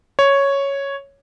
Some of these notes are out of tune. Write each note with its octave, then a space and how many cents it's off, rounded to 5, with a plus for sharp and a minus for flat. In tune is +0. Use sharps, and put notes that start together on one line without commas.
C#5 +0